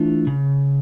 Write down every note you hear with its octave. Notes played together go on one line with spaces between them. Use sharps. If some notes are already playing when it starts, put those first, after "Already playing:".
Already playing: E3 A3 D4 F4
C#3